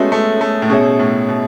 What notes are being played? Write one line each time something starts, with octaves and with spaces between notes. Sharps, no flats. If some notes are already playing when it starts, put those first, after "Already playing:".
Already playing: G#3 A3 B3 C#4 F#4 C#5 E5
A3
A3
A2
B2 C#4 G#4 C#5 E5
A2
B2